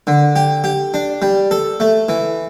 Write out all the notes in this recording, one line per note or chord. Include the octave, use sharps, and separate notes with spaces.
D3
G4
G4
D4
G3
A4
A3
E3